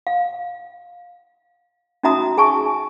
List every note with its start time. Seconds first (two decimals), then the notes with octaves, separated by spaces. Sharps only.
0.07 F5
2.03 C#4 D#4 F#4 E5 A#5 D#6
2.38 G#4 G#5 A5 C#6